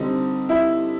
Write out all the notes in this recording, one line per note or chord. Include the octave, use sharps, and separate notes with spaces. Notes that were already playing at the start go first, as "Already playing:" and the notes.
Already playing: D3 G3 C4 D#4
E4 E5